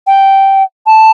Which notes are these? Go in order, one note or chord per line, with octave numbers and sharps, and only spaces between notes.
G5
A5